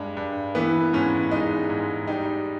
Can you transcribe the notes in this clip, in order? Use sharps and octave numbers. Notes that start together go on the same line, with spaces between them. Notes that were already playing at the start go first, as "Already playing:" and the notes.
Already playing: G2 G#3
G2
E3 B3
G#2 C#4
G#3 D#4
G#2
G3 D#4